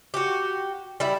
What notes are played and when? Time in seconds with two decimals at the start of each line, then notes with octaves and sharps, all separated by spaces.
0.14 F#4 G4
1.00 G3 E4